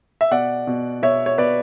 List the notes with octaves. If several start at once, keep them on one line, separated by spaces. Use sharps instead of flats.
E5
B2 D5 F#5
B2
B2 C#5 E5
C#5
B2 B4 D5